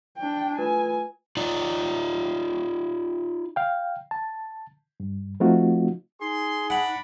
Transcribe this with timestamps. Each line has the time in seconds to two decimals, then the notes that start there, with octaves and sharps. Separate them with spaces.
0.18 D4 G5
0.59 A3 F4 B4 G#5
1.37 D#4 F4 D5
3.56 F5 G5
4.11 A5
5.00 G2
5.40 F3 A3 C4 D#4 F4 F#4
6.21 D#4 G#4 C6
6.70 D4 F#5 B5